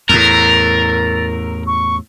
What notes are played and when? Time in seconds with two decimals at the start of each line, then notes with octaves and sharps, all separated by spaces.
0.09 E2 A2 A#4 A6
1.67 C#6